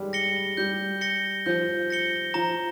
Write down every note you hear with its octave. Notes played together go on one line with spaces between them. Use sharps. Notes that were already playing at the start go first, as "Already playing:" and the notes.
Already playing: G3 G#3
A#6 C#7 G7
G3 G6
A#6 C#7 G7
F3 G6
A#6 C#7 G7
F3 A#5